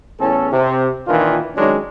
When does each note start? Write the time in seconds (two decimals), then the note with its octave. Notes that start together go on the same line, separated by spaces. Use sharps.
0.20 E2 A2 C#4 A4
0.51 C3
1.07 A#2 D#3 E3 A#3 D4 F4
1.56 D#3 F#3 G#3 C#4 D4